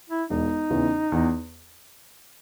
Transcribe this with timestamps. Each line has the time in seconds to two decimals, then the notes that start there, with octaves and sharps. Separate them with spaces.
0.09 E4
0.29 E1 D#4
0.71 E2 C#3 E3
1.12 E2